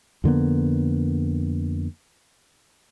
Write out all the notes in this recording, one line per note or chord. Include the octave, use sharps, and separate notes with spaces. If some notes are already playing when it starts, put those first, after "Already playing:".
F2 D3 A#3 B3